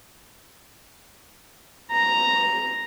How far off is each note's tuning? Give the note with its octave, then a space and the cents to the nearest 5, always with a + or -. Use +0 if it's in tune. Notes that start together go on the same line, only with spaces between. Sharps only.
A#5 -5